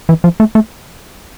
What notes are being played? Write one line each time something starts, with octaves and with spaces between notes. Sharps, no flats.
E3
F3
A3
A3